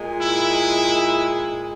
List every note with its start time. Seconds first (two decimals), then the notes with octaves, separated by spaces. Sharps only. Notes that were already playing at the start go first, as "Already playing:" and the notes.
Already playing: A#2 G#3
0.19 E4